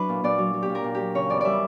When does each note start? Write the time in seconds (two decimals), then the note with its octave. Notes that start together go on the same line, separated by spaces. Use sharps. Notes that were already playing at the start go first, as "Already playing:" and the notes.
Already playing: F#3 D4 E4 B4
0.09 A#2
0.24 A#2 D5
0.38 F#3
0.54 F#3
0.62 G4
0.69 A#2
0.75 A#4
0.84 A#2
0.95 F#3 G4
1.15 C#3 C#5
1.30 E2 D5
1.41 G3 D5 E5